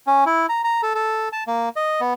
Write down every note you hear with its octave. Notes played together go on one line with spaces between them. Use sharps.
C#4
E4
A#5
A#5
A4
A4
A5
A#3
D#5
B3